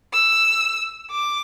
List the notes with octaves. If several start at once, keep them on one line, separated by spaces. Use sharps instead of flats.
E6
D6